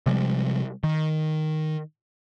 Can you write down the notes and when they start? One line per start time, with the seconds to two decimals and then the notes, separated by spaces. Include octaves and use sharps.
0.06 C3 F3 G3 G#3
0.84 D#3